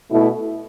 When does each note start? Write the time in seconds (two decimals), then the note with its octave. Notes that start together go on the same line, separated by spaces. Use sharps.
0.10 B2 A3 E4